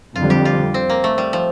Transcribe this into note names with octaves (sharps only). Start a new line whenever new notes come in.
F2 D3 G3 F4
G4
F4
C4
A#3
A3
G3
F3